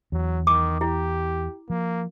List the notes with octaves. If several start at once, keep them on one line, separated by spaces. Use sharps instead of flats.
E2 F#3
D#3 D6
E4 G4
F3 A#3